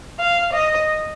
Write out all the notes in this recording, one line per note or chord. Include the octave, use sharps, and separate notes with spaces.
F5
D#5